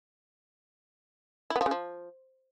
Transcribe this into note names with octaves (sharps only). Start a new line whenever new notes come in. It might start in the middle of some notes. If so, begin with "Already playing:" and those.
E4
B3
F3
C#3
F3